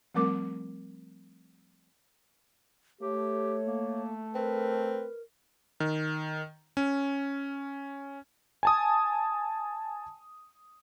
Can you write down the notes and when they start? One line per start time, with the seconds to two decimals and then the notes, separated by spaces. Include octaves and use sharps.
0.14 F3 G3 A3 C4 A#4 D6
3.01 A3 G4 C#5
3.66 A#3
4.35 C4 A#4 B4
5.80 D#3
6.77 C#4
8.63 G#5 A5 D#6